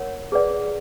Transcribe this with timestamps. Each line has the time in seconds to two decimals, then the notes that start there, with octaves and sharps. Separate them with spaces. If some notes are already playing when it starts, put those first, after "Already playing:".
Already playing: A#4 C#5 F#5
0.32 G#4 B4 D5 F#5